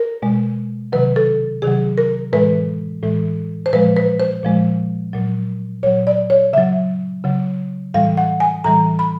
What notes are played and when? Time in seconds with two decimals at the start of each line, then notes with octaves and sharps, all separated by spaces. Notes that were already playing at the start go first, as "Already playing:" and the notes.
Already playing: A#4
0.22 B2 G#3
0.92 C3 D#3 F#3 B4
1.16 A4
1.62 C3 D#3 F#3 G#4
1.98 A#4
2.33 A2 E3 G#3 B4
3.03 A2 E3 G#3
3.66 C5
3.73 A#2 F3 G#3 B4
3.96 B4
4.20 C5
4.43 A#2 F3 G#3
5.13 A#2 F#3
5.83 A#2 F#3 C#5
6.07 D5
6.30 C#5
6.53 C#3 F#3 E5
7.24 C#3 F#3
7.94 A2 E3 G3 F5
8.17 F#5
8.40 G#5
8.64 A2 E3 G3 A#5
8.99 B5